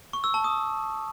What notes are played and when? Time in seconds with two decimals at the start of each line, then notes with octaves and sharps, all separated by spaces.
0.13 C#6
0.24 E6
0.34 A5
0.44 D#6